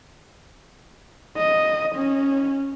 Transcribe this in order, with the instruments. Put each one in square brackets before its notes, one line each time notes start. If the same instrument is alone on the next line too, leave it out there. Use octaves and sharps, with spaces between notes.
[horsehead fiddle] D#5
C#4